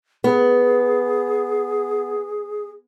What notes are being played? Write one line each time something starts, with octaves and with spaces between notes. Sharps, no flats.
B3 G#4